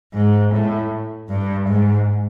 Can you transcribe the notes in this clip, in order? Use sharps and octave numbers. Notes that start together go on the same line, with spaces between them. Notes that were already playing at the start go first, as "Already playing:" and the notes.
G#2
A2
G2
G#2